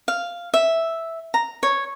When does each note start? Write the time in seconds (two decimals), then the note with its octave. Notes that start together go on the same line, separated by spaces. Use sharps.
0.08 F5
0.54 E5
1.34 A#5
1.63 C#5